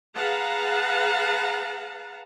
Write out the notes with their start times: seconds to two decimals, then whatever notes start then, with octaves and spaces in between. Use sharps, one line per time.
0.15 G#4 B4 F5 F#5 A5 A#5